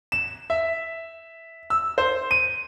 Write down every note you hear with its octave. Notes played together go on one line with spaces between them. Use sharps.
E7
E5
E6
C5
D#7